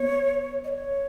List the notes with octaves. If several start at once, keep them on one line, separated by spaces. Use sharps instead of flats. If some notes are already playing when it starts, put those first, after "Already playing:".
Already playing: B3 C#5
D#5
C#5